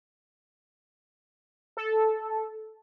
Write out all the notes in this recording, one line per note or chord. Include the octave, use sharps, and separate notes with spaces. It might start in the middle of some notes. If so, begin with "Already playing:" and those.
A4